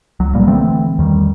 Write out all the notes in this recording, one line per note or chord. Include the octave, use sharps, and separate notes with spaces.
C#2 F#3
E1 A#2 G3 A#3
D3 E3 A3 C4
E2 D#3 G3